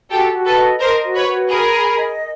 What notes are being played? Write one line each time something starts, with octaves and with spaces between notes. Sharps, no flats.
F#4 G4 A4
F#4
A4 B4
D#5
A#4 C5 D#5
F#4
B4 C#5
F#4
G#4 A#4 B5
B5
D#5